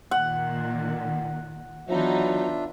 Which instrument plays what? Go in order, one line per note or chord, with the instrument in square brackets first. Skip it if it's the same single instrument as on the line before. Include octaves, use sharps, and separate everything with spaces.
[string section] A#2 D#3 [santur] F#5
[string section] E3 B3 D#4 [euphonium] F#3 [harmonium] D4 F4 E5